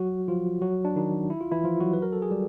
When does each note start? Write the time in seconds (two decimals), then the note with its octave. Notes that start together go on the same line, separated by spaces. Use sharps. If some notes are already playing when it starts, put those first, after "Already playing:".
Already playing: F#3 F#4
0.28 F3 F4
0.61 F#3 F#4
0.85 D4
0.96 D#3 D#4
1.30 E4
1.41 F4
1.52 E3 E4
1.64 F3 F4
1.80 F#3 F#4
1.93 B4
2.02 A#4
2.13 A4
2.22 G#4
2.31 G3 G4